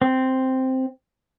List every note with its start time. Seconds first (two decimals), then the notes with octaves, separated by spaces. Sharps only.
0.02 C4